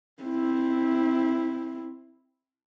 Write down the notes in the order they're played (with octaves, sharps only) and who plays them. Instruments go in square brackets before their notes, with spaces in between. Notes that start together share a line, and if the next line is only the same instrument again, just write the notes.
[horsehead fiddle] C4 E4